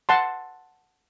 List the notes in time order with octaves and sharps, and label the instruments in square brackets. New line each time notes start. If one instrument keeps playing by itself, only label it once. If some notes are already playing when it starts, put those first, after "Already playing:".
[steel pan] F#5 A5 C6